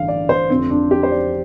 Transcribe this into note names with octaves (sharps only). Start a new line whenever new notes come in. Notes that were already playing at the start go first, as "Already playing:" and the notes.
Already playing: A1 G2 D3 F5
D5
C5
F1 F2 D3 C4
D4
G4
C5
D5